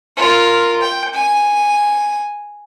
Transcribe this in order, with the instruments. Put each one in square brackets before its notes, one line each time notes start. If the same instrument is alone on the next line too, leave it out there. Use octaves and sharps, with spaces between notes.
[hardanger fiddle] F4 A#4
G5
G#5